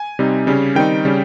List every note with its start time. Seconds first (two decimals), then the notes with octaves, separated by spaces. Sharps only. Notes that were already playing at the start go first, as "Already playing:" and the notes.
Already playing: G#5
0.19 C3 G3 C4 D#4
0.47 C#3 G3 C#4
0.75 D#3 G3 C4 D#4 G5
1.05 C#3 G3 C#4